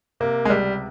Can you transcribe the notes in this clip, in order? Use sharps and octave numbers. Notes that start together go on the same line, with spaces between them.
C3 A#3
G#3
C#2 G3